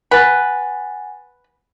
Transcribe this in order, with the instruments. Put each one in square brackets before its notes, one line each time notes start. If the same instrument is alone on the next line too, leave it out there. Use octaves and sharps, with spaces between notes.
[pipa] B4 [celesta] F#5 G#5 A6